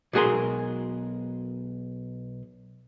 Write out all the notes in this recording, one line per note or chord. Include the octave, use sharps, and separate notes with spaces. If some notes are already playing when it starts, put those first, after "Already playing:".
B1 G#3 F#4 G#4 A#4 C6